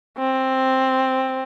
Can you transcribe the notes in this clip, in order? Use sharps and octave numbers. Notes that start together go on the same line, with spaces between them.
C4